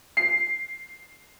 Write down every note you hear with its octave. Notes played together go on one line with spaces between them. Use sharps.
C7